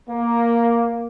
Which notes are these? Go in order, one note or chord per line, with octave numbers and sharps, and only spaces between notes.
A#3